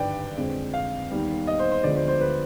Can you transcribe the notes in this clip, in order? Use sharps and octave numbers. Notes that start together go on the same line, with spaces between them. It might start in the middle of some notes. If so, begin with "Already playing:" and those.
Already playing: G#1 G2 D3 G3 B4 D5 G5
F2 D3 G#3 C4
F5
D#2 D#3 G3 B3
D#5
C5
C5
D2 D3 F3 G#3 B3 D5
C5
C5
B4